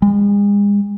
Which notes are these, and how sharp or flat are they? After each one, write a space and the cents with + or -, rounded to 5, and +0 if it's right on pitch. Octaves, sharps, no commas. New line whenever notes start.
G#3 -40